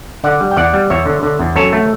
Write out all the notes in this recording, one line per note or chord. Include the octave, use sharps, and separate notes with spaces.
D3 D5 F#5
G3
G5
E2 D5 F#5
G3
E2 C#5 E5
D3
D3
E2
F#2 A4 C#5
A3